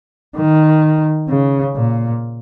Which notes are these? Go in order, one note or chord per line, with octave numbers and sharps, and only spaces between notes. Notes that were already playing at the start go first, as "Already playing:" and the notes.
D#3
C#3
A#2